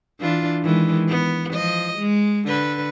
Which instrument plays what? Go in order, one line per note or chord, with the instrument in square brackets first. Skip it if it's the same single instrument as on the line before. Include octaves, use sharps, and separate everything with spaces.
[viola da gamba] E3 D4 F4
D#3 E3 G#3
B3
F3 D#5
G#3
D3 B4